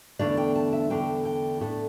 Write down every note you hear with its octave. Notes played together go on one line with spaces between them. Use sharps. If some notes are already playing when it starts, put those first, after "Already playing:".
E2 D3 A3 D4 D5
G5
A5
E5
E2 D3 A3 D4 G5
G5
A2 A3 D4 A4